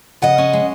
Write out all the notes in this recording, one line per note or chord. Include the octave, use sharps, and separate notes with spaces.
C#3 D#5 F#5
C#4
G#3